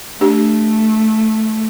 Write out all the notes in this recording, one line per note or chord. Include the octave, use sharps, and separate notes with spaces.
A3 D4 G4